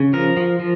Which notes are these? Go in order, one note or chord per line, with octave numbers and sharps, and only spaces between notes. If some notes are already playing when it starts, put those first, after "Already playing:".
Already playing: C#3
F3 A#4
F3
F3